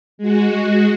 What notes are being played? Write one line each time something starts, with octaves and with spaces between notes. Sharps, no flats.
G#3 F#4